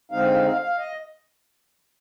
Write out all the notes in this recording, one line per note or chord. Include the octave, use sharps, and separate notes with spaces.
D3 G#3 C4 D#4 F5
F5
F5
F5
D#5